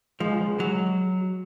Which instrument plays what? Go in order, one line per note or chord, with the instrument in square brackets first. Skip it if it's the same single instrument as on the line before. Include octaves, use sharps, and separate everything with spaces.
[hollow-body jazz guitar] F3 [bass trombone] G#3
[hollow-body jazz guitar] F#3